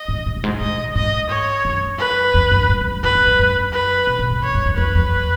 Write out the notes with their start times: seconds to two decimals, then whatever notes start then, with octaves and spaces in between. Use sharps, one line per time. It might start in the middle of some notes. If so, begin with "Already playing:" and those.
Already playing: D#5
0.08 G#2
0.26 G#2
0.37 F#2
0.44 G#2
0.60 G#2 D#5
0.78 A#2
0.95 G#2 D#5
1.29 C#5
1.65 F#2
1.99 B4
2.34 F2
2.51 F#2
2.69 G#2
2.81 F2
2.92 F#2
3.03 F#2 B4
3.15 F#2
3.27 F2
3.39 F#2
3.73 B4
4.07 B2
4.19 A#2
4.31 G#2
4.42 F2 C#5
4.55 F#2
4.66 F2
4.77 F2 B4
4.95 F2